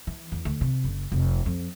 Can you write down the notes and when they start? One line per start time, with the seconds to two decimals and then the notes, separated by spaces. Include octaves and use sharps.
0.07 E3
0.32 E2
0.45 D2
0.61 C3
0.84 F#1
1.12 F1
1.46 F2